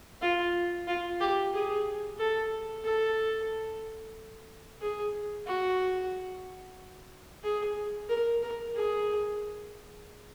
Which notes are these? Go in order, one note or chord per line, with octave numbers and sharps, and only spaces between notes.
F4
F4
G4
G#4
A4
A4
G#4
F#4
G#4
A#4
A#4
G#4